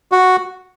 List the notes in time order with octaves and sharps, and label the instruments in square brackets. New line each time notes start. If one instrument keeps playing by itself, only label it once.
[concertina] F#4